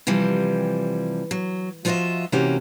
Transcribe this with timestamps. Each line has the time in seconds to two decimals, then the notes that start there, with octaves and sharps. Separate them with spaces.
0.07 C3 E3 F3 G3
1.31 F#3
1.85 F3 F4 F#4 A#4 D#5 E5
2.32 C3 E3 A#3 C#4 F#4 G4